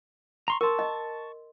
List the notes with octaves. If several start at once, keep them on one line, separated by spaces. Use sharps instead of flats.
A#5 C6 C#6
A#4 A5 C6 C#6
D#5